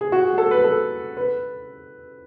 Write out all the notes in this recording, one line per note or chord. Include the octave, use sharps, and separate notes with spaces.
G#4
F#4
G#4
A4
B4
A4
B4